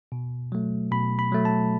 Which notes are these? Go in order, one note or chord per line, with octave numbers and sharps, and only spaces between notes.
B2
F#3 A3
B2 B5
B5
F#3 A3
A5